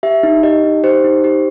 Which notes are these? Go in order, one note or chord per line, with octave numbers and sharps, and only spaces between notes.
G4 E5
D#4
G4 D#5
D#4
G4 C5
D#4
G4